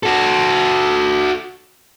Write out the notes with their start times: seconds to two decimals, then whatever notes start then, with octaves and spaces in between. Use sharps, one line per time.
0.03 F#4 A4